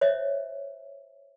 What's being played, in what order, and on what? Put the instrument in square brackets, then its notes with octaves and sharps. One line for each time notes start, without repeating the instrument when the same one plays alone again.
[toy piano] C5 C#5 D#5 E5